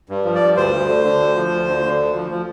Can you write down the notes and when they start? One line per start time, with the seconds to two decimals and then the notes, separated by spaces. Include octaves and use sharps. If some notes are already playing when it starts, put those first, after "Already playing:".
0.09 G2
0.25 F3
0.35 D5
0.41 G2
0.56 D2 C5
0.73 D2
0.88 D3
1.04 D3
1.21 D2
1.36 F3
1.52 D2
1.68 D3
1.83 D3
1.99 D2
2.15 F3
2.31 F3